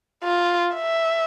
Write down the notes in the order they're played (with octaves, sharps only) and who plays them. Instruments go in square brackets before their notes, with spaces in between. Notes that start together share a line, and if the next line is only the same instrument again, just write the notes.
[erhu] F4
E5